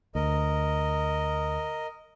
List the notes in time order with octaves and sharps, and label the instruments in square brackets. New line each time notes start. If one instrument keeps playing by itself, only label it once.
[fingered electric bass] D2 [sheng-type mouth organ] A#4 D#5